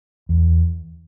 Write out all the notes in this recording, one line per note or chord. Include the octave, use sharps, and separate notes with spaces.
E2